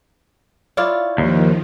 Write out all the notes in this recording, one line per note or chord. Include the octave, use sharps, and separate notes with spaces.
E4 F4 C#5 D5
D#2 D#3 F3